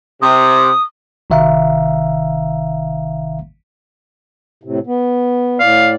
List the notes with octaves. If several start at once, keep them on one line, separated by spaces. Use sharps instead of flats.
C3 D#6
G#1 C3 D#3 E5 F5 A#5
A2 C3
B3
A2 D5 F5